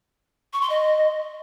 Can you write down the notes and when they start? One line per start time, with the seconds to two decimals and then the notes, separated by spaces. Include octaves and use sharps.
0.53 C#6
0.61 C6
0.70 D#5